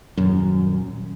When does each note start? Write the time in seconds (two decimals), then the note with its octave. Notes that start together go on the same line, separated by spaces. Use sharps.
0.17 D#1 F#2